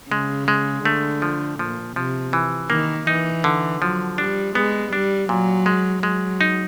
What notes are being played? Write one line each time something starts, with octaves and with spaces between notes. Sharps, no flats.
C#3 G#3
G#3
D3 A3
F3
A#2 F3
C3 F3
E3
D#3 A#3
E3 D#4
D3
F3 F#3
G3 D4
G#3 B3
G3 D4
A#2 F#3
G#3
F#3 G#3
D#4